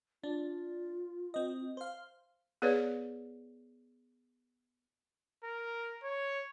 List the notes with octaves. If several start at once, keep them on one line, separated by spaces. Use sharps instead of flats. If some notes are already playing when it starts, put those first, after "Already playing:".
D4 F4
C4 D#5
C5 F5
B3 G#4 B4 C#5 D5
A#4
C#5